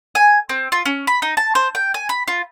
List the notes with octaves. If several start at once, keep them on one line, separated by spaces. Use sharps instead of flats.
G#5
C4
F4
C#4
B5
D#4
A5
C5
G5
G#5
B5
F4